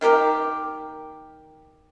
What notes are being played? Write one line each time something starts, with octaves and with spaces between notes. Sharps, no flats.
D#3 A#3 G4 A#4